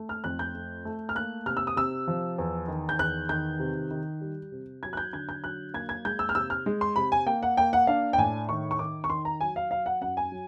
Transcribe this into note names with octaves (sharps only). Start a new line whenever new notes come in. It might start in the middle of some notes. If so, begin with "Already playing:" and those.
Already playing: A3
F6
F2 F#6
G6
A3
A3
F6
A#3 F#6
C3 F6
E6
D#6
C3 E6
F3
E2
D#3
G6
E2 F#6
D#3 G6
C3
D#3
G3
C3
F#3 G#6
F#6
G6
D3 G#6
G6
F#3 F#6
A#3 G#6
G#6
G#3 G6
E6
F6
C3 E6
F6
G#3
C6
C3 B5
G#5
A#3 G5
F#5
A#3 G5
F#5
D4 F5
G5
A2 G#5
D#3 C#6
C#6
D#3 D6
C#6
D#3 C6
A#5
F#3 G#5
F5
F#3 F5
F#5
F#2 F#5
G#5
F#3